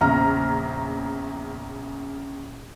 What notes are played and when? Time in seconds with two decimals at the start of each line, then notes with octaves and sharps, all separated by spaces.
0.01 A#1 E2 C#3 A#5 F6